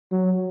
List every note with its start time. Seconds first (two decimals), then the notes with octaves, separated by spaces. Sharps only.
0.12 F#3